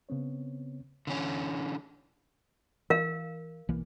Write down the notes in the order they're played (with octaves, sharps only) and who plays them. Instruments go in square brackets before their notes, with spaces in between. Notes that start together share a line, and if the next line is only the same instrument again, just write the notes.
[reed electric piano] C#3 B3 C4 C#5
[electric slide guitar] D3 E3 C#4
[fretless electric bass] E3 [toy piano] A#4 F5
[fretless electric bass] B1 E3 A#3